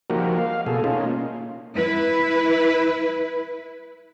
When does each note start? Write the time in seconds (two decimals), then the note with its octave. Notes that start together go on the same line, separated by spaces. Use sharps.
0.10 F3 A#3 D#4 F#4 G4 A#4
0.38 F5
0.66 B2 A#3 G#4 A4
0.84 A#3 C#4 D#4 F4
1.74 E4 B4